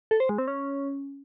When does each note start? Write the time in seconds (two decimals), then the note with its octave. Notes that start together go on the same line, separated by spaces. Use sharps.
0.11 A4
0.20 C5
0.29 G#3
0.38 C4
0.48 C#4